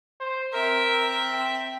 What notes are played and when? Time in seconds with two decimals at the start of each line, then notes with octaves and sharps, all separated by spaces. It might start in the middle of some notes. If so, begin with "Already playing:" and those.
0.20 C5
0.54 C4 A#4 E5
1.33 G5